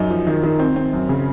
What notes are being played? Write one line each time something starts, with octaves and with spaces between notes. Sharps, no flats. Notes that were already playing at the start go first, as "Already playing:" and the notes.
Already playing: F#2 D#4
F3
D#3
D#3
C4
C4
F#2
C#3